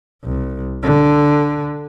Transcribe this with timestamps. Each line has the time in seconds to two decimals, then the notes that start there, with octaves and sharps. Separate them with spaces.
0.24 C2
0.83 D3